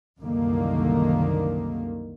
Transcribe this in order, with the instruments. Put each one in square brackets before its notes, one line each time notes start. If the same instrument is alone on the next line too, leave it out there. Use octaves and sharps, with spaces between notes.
[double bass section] C2 F#2 D3 D#3 A#3